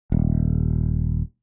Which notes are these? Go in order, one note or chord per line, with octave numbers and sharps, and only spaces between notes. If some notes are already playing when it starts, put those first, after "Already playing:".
D#1